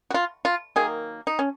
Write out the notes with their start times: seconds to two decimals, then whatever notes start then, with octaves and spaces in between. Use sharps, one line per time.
0.10 F#4
0.14 F4
0.45 F4
0.76 D#3 F#3 A#3 G#4
1.27 D#4
1.39 C#4